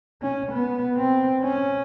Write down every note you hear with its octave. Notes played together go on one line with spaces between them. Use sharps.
C#4
B3
C4
C#4